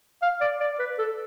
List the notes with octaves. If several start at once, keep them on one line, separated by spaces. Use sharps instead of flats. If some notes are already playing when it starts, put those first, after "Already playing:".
F5
D5
D5
B4
A4